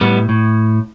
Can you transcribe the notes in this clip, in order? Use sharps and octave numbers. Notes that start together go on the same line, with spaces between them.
A2 G3 B3
A2